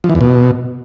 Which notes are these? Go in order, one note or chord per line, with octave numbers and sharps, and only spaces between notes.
F3
E3
E2
B2